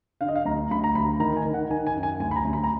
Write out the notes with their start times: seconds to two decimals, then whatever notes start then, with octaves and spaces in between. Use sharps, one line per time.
0.21 D3 F5
0.28 D#5
0.35 F5
0.45 D2 A#5
0.70 D2 B5
0.84 A#5
0.95 D2 B5
1.20 D#3 A#5
1.37 G#5
1.45 D#3
1.53 F#5
1.70 D#3 G#5
1.87 G#5
1.95 F#2
2.03 G#5
2.20 D2 G#5
2.31 B5
2.36 A#5
2.45 D2
2.53 B5
2.64 A#5